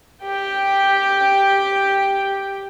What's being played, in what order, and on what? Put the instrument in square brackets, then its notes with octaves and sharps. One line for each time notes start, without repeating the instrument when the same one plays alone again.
[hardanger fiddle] G4 G5